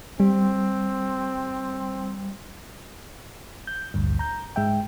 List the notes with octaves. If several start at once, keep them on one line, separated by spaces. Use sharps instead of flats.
G3 C4
G6
A1 D2 G2
A#5 G6
G#2 G#3 E5 G5